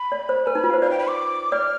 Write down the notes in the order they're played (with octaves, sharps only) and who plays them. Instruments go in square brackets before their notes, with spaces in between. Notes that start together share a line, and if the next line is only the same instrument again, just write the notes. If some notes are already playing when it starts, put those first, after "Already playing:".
Already playing: [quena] B5
[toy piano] D5
C5
[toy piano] B4 [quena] G#5
[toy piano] D#4
[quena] B5
[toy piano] F4
[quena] F5
[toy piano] C5
[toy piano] D5 [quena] F5
[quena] G5
B5
D6
[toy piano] D5 [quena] F6